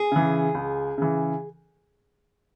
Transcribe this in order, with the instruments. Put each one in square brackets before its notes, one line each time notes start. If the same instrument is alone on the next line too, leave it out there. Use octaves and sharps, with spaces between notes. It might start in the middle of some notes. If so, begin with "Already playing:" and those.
Already playing: [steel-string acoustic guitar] G#4
[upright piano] C#3 E3
C#2
C#3 E3